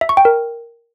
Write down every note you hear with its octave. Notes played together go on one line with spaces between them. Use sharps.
E5
C#6
G5
A#4